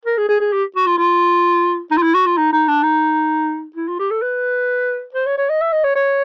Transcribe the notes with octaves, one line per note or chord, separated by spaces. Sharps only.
A#4
G#4
G#4
G#4
G4
F#4
F4
F4
D#4
F4
E4
F#4
F4
D#4
D#4
D4
D#4
E4
F4
G4
A4
B4
C5
C#5
C#5
D#5
E5
D#5
C#5
C#5